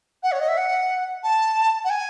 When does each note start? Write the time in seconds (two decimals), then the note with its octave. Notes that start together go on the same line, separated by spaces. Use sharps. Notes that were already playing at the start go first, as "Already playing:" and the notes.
0.23 F#5
0.32 C#5
0.40 D#5
0.48 E5
0.57 F#5
1.24 A5
1.84 F#5
1.90 G#5